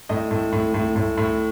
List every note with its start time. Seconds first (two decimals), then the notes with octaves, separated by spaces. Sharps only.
0.09 A2 D#5
0.31 A2
0.52 A2
0.74 A2
0.96 A2
1.17 A2